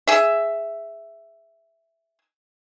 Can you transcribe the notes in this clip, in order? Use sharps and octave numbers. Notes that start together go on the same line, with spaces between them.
G#4 E5